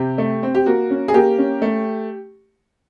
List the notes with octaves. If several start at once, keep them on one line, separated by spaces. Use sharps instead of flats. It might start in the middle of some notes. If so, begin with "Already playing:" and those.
Already playing: C3 G4
A3
C4
G4
A#3 F#4
C#4
G#4
A#3 G4
C#4
A3